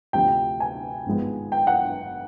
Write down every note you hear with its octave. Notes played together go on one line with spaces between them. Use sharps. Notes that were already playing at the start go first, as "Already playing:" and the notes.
D2 C3 F3 G5
G#5
G#1 G#2 F3 G#3 B3
G5
F#5